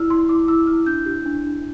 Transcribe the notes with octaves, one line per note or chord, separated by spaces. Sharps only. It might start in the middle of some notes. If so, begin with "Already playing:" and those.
Already playing: E4 D5 E6 F6
E4 C6
E4 D6
E4 E6
E4 F6
D4 G6
G4
D4
D4